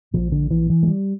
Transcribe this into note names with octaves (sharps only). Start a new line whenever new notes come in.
A#1 A#2 F3
D3
E3
E3
A3
G3